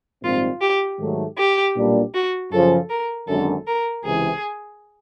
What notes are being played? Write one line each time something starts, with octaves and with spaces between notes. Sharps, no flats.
A#1 G#2 D#3 G3 C4 F4
G4
G#2 D#3 F#3 A3
G4
B1 A#2 G3 A#3 D4
F#4
F#2 C#3 F3 A4
A#4
G#1 F#2 D3 A4
A#4
C#2 C3 E3 G#4